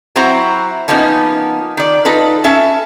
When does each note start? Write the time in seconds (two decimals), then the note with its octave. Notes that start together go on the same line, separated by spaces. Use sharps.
0.16 F#3 C4 E4 F#4 C5 A#5
0.88 F3 A#3 B3 C#4 D#4
1.77 D#3 D5
2.05 D#4 F4 A4 B4
2.44 C#4 A4 E5 A5